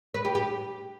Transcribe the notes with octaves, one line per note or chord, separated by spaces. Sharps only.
B4
G4
G4